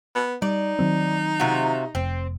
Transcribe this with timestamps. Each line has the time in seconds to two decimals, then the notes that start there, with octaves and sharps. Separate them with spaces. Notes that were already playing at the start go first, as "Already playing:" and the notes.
0.15 B3
0.42 G3 D#4 D5
0.79 D#3 F#3 C4
1.40 C3 F4 F#4
1.95 F1 C4